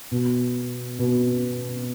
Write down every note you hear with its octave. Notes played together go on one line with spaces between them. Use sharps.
B2
B2